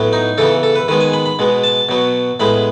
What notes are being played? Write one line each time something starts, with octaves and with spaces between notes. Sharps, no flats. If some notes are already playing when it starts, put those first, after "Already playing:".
Already playing: A2 F#3 B3
D#4
C#3 E3 B3 A4
A4
B4
D#3 G#3 B3 B4
G#5
B5
B5
B2 G#3 B3
A5
B2 F#3 B3
A2 G#3 B3 B5